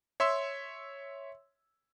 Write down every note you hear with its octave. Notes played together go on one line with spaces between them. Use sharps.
C#5 E5 C6 E6